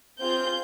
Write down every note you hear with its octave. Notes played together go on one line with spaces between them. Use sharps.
C4 F4 G#4 G6